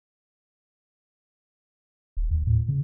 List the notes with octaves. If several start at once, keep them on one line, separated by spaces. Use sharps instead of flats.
D#1
D#2
A2
C#3